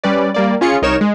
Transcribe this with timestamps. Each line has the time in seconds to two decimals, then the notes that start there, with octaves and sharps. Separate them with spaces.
0.04 G3 C#4 B4 D5
0.34 G3 A#3 D5
0.61 C#4 F4 G#4 C#7
0.82 C2 D#4 A#4 C#5 E7
1.01 G#3